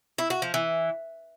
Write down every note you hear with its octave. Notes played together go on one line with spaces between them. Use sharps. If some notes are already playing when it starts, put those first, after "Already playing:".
E4
F#4
F3
E3